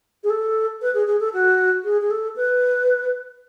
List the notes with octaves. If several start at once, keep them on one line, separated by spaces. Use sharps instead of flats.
G#4
A4
B4
G#4
G#4
A4
F#4
G#4
G#4
A4
B4